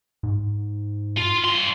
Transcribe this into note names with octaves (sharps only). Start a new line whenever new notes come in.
G#2
F4
G2 C6